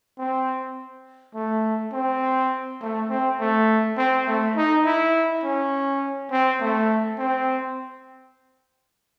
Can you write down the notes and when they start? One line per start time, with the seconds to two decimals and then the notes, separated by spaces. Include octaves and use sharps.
0.19 C4
1.35 A3
1.93 C4
2.81 A3
3.10 C4
3.40 A3
3.97 C4
4.27 A3
4.56 D#4
4.85 E4
5.44 C#4
6.31 C4
6.61 A3
7.18 C4